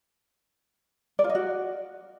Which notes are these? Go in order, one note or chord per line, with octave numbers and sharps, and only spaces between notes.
D5
F4
D#5
F#4